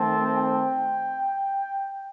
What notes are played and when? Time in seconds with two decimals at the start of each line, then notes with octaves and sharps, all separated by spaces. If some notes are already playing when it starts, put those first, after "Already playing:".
Already playing: D#3 A3 C4 A5
0.35 G5